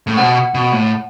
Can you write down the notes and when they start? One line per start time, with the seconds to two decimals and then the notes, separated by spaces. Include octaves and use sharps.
0.07 A2
0.17 B2 F#5
0.54 B2
0.72 A2